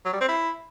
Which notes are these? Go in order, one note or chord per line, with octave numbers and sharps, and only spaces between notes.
F#3
G3
C4
E4